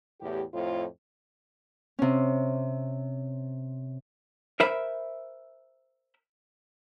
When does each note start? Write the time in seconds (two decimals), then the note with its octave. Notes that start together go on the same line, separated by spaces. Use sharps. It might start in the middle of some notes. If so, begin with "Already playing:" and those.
0.21 E2 A2 G4
0.53 F2 A2 F4 C5
1.99 C3 C#4
4.60 A#4 C5 E5 B5